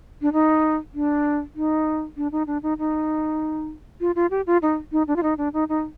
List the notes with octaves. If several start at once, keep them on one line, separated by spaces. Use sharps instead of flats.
D4
D#4
D4
D#4
D4
D#4
D4
D#4
D#4
F4
F4
G4
F4
D#4
D#4
D4
F4
D#4
D4
D#4
D#4